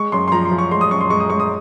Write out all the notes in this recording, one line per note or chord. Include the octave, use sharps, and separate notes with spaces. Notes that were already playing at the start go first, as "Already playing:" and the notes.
Already playing: G#3 C#6
F#2 C6
C6
F3 A#5
C6
F3
C#6
G#3 C6
D#6
F#2 C#6
C6
G#3 C#6
D#6
G#3 C#6
D#6